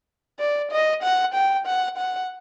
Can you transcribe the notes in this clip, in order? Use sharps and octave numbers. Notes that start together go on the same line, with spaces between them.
D5
D#5
F#5
G5
F#5
F#5